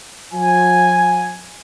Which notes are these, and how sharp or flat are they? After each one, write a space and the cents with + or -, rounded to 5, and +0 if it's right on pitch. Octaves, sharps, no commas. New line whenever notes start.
F3 +45 G#5 +0